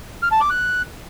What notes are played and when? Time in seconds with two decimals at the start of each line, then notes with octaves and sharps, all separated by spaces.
0.23 F6
0.32 A5
0.41 D6
0.50 F#6